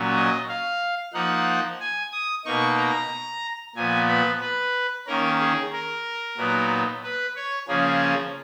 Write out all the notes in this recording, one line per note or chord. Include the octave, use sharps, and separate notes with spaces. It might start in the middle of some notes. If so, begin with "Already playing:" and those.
Already playing: A#2 F#3 C#4
D#5
F5
F3 A#3 D#4 F#5
G#5
D#6
B2 A#3 D#4 C#6
A#5
A#2 F3 B3 G#5
B4
B4
D#3 A#3 C#4 A#4
G#4
A#4
A#2 F#3 B3 D#4
B4
C#5
C#3 F3 A#3 C#4 G#4